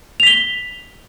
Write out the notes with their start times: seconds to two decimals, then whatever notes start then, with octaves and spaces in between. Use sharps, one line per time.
0.20 F7
0.23 B6
0.27 G7